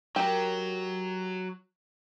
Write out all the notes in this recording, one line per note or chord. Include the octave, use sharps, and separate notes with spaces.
F#3 G4 A#4